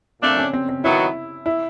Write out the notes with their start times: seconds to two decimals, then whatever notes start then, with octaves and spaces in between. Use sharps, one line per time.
0.22 A#2 F3 A3 C4 D4
0.37 C#4
0.53 C4
0.69 C4
0.84 D#3 F#3 B3 E4
1.46 E4